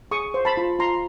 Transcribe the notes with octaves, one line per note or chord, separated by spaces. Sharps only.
G#4 C#6 D#6
C5
A5 B5
F4
F4 A#5 C6